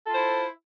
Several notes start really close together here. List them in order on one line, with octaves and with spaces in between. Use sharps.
A4 F4 C5 E4